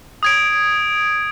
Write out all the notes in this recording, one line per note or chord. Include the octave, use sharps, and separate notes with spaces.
D#6 G#6 D7